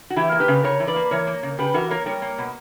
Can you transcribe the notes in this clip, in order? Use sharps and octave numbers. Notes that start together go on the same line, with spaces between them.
F#4
E3 E4 G4
A#3
G4 B4
C#3
C#3 A#4 C#5
E3
B4 D5
A#3
E3 A#4 C#5
A#3
C#3
C#3 G4 B4
E3 F#4 A#4
A#3 A#4 C#5
G3 A#4 C#5
A#3
B2